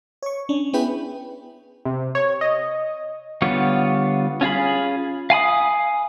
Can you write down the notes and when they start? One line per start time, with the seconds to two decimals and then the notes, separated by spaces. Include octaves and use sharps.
0.22 C#5 C#6
0.49 C#4 D4
0.73 B3 E4 G#4 B4 G5 B5
1.85 C3
2.15 C#5
2.41 D#5
3.42 D3 G3 B3 F4 C#5
4.41 C#4 F4 G#4 B5
5.30 F5 G#5 B5 D#6